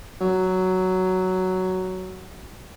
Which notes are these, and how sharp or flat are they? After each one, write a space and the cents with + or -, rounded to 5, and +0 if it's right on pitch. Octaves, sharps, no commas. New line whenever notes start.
F#3 +5